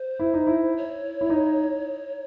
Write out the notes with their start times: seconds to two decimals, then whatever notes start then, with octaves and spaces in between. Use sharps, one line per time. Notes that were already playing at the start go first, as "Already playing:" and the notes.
Already playing: C5
0.19 E4
0.34 D#4
0.47 E4
0.77 C#5
1.21 E4
1.30 D#4